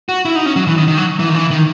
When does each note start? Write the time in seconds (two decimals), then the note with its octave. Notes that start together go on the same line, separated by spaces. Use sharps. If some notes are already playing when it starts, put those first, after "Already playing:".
0.09 F#4
0.25 E4
0.36 D#4
0.46 C#4
0.56 F#3
0.67 E3
0.77 D#3
0.88 D#3
0.98 F#3
1.19 E3
1.29 D#3
1.34 E3
1.51 D#3